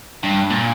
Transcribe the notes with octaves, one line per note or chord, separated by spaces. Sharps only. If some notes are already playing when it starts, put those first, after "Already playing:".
G2
A#2